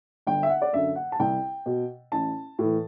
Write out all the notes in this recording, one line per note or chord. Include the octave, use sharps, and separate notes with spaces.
G1 G5
E5
F#5
D5
F#2 D3 E5
F#5
A5
C2 G5
B2
A1 A5
A2 E3